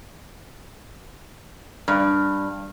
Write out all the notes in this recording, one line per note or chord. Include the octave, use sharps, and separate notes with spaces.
G2